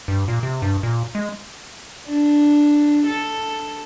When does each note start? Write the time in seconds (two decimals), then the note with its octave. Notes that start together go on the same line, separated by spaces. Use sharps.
0.08 G2
0.28 A#2
0.43 C3
0.62 G2
0.83 A#2
1.15 G#3
2.08 D4
3.07 A4